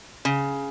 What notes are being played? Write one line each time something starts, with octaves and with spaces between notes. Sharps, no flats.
C#3